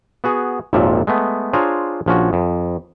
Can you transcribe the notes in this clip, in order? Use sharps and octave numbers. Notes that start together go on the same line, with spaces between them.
B3 F#4 G#4
G#1 D#2 A#2 F3 E5
G#3 A3 B3
D4 F4 G#4 C5 C#5 A#5
A#1 F3 C#4 F#4
F2